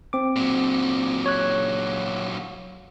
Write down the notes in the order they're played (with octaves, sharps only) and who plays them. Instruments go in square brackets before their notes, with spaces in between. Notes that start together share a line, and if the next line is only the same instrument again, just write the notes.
[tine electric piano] C4 D6
[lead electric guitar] A#2 F#3
[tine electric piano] C#5 F#6